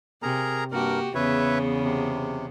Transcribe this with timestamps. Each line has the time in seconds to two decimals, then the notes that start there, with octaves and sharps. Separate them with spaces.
0.23 C3 G#4 A#4 A#5
0.72 G2 A#3 F#4 G4 A#4
1.15 E2 C#3 B3 B4 C#5 E5
1.83 C3